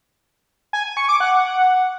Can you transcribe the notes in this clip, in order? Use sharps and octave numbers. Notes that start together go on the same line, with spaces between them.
G#5
G#5
C#6
D6
F#5